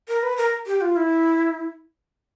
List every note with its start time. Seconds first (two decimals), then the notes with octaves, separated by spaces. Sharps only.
0.08 A#4
0.23 B4
0.37 A#4
0.67 G4
0.81 F4
0.96 E4